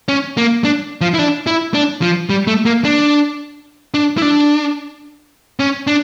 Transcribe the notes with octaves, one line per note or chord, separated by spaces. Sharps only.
C#4
A#3
D4
F3
E4
D4
E4
D4
F3
G3
A3
A#3
D4
D4
E4
D4
C#4
D4